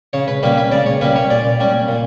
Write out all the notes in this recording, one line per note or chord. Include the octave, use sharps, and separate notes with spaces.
C#3 C#5
B4
G3 A#3 C#4 B4
B4
C#3 D5
C#5
G3 A#3 C#4 B4
C#5
A#2 D5
G3 C#4
A#2